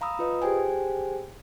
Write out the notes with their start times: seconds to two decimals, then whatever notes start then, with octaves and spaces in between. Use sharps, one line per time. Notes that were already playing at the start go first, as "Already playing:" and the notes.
0.01 F5 A#5 B5 D#6 E6
0.19 F4 B4 D#5 D#6
0.42 G4 G#4 C5 G5 G#5